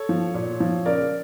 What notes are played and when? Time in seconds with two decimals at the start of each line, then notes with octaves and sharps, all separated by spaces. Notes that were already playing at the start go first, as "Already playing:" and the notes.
Already playing: A4 C#5
0.09 F3
0.34 A#2
0.60 F3
0.86 C#3 A#4 D5